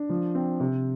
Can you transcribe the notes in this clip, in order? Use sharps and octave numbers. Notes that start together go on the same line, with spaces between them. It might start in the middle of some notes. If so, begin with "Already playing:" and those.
Already playing: D4
F3
C4
C3